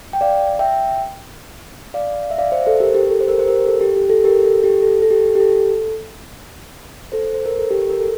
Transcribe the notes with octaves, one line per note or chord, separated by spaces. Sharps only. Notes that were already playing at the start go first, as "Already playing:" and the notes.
G5
D5 F5
E5 G5
D5 F5
F5
E5
D5 F5
C5 E5
A4 C5
G4 A#4
G4
A4
C5
G4 A#4
C5
G4 A#4
A4
G4
G4
A4
G4 A#4
A4
G4
A4
A4
G4
G4
A4
A4 C5
C5
A#4
A4
G4
A#4
A4